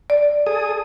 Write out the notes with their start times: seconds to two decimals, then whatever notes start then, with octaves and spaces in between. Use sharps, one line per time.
0.10 D5
0.46 G#4 A4 D#6